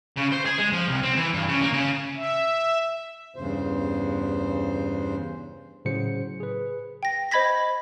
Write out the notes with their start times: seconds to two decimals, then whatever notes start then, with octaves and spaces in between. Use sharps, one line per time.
0.16 C#3
0.32 C5
0.45 G#4
0.59 G#3
0.73 F3
0.88 C2
1.03 C4
1.16 E3
1.35 G2
1.48 C#3
1.61 A#3
1.73 C#3
2.16 E5
3.36 E2 G2 C#3 C5
5.85 A2 C#3 F#3 C5 C#7
6.40 G#4 B4
7.03 G5 A#6
7.31 C5 D#5 B5 G#6 A#6 B6